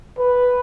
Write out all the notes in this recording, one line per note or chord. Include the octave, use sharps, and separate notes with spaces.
B4